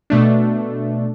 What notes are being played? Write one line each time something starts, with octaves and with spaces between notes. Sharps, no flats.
B2 A3 D4